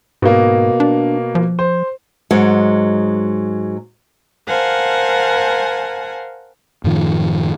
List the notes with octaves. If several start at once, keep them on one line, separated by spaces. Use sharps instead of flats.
G#2 B2 A#3
D4
F3
C5
G#2 F#3 G#3
A#4 C5 F5 F#5 G#5 A5
F#2 A2 D#3 F3